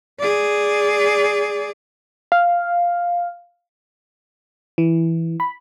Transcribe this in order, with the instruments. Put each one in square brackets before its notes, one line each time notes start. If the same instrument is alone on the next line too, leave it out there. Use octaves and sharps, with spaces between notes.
[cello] G#4 D5
[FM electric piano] F5
E3
B5